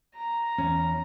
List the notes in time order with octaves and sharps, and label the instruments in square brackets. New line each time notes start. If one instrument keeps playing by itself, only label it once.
[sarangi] A#5
[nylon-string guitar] E2 C#4